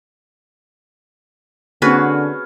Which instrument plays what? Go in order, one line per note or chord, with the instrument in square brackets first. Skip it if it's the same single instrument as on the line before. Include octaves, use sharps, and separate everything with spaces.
[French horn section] D3 [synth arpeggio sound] A#3 C4 [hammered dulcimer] C#4 [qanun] F#4 G#4 B4